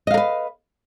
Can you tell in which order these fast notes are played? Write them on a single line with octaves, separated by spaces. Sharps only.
D#5 F5 A#4 B4